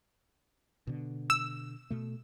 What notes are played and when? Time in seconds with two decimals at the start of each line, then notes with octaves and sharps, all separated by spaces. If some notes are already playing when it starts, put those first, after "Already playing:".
0.87 B2 D3
1.30 E6
1.90 B2 A3